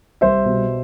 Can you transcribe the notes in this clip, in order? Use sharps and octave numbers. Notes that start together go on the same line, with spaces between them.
C2 C5 E5
B2